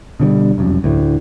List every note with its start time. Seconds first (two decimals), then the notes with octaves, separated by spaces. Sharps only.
0.20 B2 D3 F3 G3
0.58 F1 C2 F#2
0.84 D2 A2